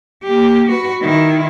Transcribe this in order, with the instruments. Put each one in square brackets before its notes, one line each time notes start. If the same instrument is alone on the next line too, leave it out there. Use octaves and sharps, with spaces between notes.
[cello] A#3 G4
F#4 B4
D#3 E4